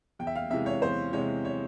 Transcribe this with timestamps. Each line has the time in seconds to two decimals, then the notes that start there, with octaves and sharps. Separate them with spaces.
0.19 E2 G5
0.27 E5
0.36 F5
0.50 C3 E3 G#3 E5
0.66 C#5
0.82 E2 C5
1.13 C3 E3 G#3 C#5
1.45 C#5